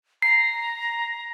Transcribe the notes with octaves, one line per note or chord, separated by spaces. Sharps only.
A#5 C7